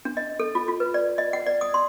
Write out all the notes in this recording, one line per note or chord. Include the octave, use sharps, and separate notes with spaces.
D4
D#5
A4
F4
F4
B4
D5
D#5
F#5
D5
D#6
C6